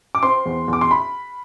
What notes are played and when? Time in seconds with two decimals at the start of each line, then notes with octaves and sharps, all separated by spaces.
0.15 D6
0.23 C4 C6
0.46 E2
0.68 E2
0.73 D6
0.81 C6
0.91 B5